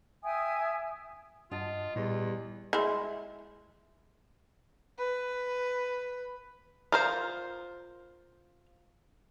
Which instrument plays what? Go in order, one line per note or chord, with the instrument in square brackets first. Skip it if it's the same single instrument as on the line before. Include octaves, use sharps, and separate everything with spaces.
[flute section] E5 G5 G#5 D#6
[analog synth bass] G2 [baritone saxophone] F4 [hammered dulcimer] D#5 F#5 A5
[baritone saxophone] E2 [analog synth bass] A#2 [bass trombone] G3
[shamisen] G#3 E4
[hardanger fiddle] B4
[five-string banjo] F4 A#4 C5